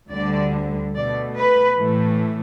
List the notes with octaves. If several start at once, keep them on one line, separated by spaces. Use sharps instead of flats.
D2 D3 G3 D5
B2 A3 D5
B4
A2 E3 A3